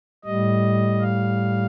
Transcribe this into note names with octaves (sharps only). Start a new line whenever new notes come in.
A2 G3 D#5
F5